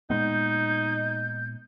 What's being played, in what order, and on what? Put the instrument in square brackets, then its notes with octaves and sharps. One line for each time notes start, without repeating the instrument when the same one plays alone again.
[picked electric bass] A#2 G#3 B3 [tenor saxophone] D#4 [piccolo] G6